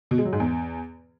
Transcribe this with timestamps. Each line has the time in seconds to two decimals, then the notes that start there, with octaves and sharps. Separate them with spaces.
0.11 B2
0.18 G#3
0.25 F#3
0.33 G#2
0.40 E2